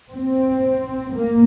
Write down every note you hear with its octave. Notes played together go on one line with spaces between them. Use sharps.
C4
A#3